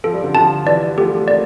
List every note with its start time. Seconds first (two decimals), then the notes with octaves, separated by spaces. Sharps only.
0.04 F3 A4
0.13 G3
0.24 D3 F3
0.35 D3 F3 A5
0.66 E3 G3 D5
0.97 F3 A3 G4
1.28 G3 A#3 D5